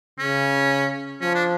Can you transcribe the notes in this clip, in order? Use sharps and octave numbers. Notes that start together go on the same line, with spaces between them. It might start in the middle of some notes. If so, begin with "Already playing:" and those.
C#3 C#4
F3 C#4
D4